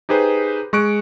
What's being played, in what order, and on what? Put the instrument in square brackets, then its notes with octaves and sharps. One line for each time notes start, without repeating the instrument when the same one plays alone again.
[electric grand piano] D#4 G4 G#4 B4 C5
G#3 C#6 F#6 D7